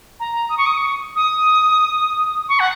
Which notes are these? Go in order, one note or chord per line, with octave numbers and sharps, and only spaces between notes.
A#5
D#6
C#6
D#6
C#6
D#6
C#6
F#5